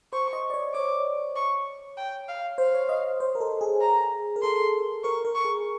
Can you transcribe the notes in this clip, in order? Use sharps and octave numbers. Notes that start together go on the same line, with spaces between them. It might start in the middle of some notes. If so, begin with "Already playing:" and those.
C5 C#6
D#5
D5
C#5
C#5 D6
C#6
G5
F5
C5 F5
C#5
D#5
C5
A#4
A4
G#4
A#5
A#4
A4 C6
A#4 C#6
A#4
C#6
G#4